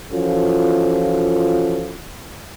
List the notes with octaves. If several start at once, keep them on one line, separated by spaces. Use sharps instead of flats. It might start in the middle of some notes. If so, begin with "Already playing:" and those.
E3 F3 C#4 F4 F#4 A4